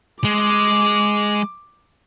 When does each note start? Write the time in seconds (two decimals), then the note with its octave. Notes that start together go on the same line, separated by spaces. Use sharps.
0.24 G#3 D6